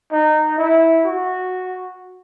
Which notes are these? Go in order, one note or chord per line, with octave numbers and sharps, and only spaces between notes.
D#4
E4
F#4